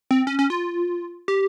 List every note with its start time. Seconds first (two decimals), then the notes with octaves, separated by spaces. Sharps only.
0.11 C4
0.27 C#4
0.39 C#4
0.50 F4
1.28 G4